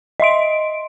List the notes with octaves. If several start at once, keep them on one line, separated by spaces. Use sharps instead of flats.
D#5 E5 C6 D7